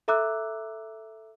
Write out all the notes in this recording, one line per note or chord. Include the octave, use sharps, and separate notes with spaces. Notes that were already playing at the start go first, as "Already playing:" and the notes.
A4 E5 A#5 D6 E6 F#6